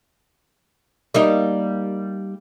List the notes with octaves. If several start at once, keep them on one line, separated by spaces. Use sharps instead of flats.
G3 A#3 D#4